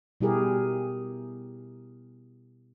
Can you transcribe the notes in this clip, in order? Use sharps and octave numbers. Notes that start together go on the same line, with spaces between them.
B2 G3 E4 G4 G#4 A#4